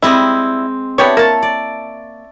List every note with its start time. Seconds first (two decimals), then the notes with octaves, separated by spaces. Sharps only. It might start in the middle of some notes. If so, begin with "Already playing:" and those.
0.02 G3 G#3 C4 E4 D#5
0.98 B3 D4 E4 G4 C#5
1.17 A#3 C#5 A5
1.42 D5